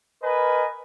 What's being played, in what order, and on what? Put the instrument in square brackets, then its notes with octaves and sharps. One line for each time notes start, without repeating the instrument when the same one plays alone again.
[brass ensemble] A#4 B4 D#5 G#5